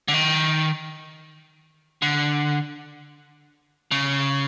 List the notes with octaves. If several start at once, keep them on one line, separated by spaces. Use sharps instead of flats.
D3
D#3
D3
C#3